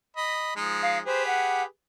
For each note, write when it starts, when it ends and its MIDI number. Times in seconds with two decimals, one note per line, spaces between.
0.16 0.53 75
0.16 0.53 83
0.56 1.00 53
0.56 1.00 56
0.56 1.00 63
0.83 0.98 77
1.06 1.64 67
1.06 1.64 68
1.06 1.64 71
1.06 1.25 72
1.27 1.63 78